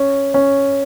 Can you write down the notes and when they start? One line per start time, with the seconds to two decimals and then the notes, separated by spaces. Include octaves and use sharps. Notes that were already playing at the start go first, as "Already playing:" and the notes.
Already playing: C#4
0.34 C#4